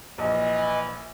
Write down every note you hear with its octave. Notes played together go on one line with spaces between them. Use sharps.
A#1 E3 D#5